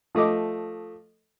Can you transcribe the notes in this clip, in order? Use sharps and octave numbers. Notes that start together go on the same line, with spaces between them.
F3 A3 D#5 D6